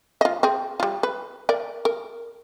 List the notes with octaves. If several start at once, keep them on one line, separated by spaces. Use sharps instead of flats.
F4 D#5
C4 G#4
G3 F4
B4
A#4 D5
A#4